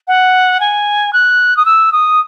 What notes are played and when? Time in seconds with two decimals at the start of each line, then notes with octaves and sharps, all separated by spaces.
0.08 F#5
0.60 G#5
1.13 F#6
1.57 D#6
1.66 E6
1.92 D#6